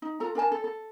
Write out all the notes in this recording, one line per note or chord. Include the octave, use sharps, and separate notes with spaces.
D#4
F4 A4 A#5
D4 A#4 G#5 A5
A4
A4